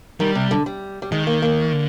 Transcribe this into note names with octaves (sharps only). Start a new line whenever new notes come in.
D#3 G3
C3
D3
G3
G3
D#3 G#3
A#3
A#3
D3